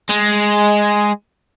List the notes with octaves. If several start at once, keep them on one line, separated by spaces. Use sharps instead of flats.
G#3